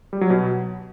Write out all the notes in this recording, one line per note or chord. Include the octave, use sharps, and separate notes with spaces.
G3
F#3
B2